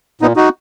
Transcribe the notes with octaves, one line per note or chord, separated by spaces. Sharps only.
A#2 B3 D#4
D#4 F#4